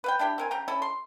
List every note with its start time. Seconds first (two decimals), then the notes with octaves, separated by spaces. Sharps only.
0.04 B4 F5 G5
0.19 D4 E4 G4 G5
0.38 C4 A#4 G#5
0.51 C#3 G5 A#5
0.68 C#4 E4 A4
0.82 C6